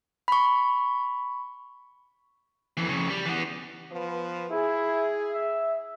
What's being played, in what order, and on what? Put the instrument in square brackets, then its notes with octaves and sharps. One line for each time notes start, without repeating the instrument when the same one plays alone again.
[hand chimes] B5 C#6
[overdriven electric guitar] F2 E3
F2 C#3
G3
E3 B3
[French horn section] F3 B3 B4
[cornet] E4 [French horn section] G#4
[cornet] E5